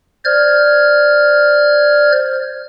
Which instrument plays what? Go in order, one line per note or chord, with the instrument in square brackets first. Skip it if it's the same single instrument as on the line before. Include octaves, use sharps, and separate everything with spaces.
[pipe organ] C5 D5 F6 G#6